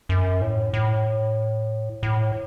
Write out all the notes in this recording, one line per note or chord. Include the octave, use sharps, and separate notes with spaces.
F#2
A2
A2
A2